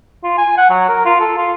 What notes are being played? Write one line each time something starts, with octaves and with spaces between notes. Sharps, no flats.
F4
G#5
F#5
F#3
A#4
F4
A4
F4